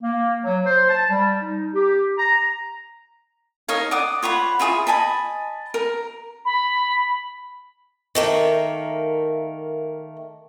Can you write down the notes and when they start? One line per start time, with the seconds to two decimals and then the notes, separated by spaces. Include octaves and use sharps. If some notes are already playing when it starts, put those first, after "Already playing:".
0.02 A#3
0.43 F#3
0.66 C5
0.90 A5
1.10 G3
1.42 D#4
1.74 G4
2.18 A#5
3.68 D#4 A#4 C#5 F5
3.91 D5 F#5 D#6
4.22 F4 C#5 F#5 B5
4.59 E4 F4 G#4 C#5
4.87 D#5 G#5 A5 B5
5.74 A#4
6.45 B5
8.15 D#3 A3 A#3